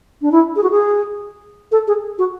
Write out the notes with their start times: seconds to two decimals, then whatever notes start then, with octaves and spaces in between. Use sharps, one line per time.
0.22 D4
0.32 E4
0.56 G#4
0.63 F#4
0.71 G#4
1.72 A4
1.87 G#4
2.18 F#4